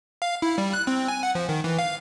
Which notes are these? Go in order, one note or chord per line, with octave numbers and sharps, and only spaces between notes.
F5
E4
G3
F#6
C4
G#5
F#5
F3
D#3
E3
F5